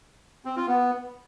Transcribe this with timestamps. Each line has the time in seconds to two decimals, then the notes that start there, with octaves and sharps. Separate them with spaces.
0.45 C4
0.56 F4
0.68 B3